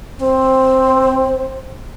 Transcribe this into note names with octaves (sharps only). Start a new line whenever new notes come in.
C4 C5